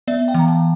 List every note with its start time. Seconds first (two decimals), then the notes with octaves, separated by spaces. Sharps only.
0.08 B3 D5 E5
0.28 F5 G5
0.34 E3 A#5
0.48 G5 A5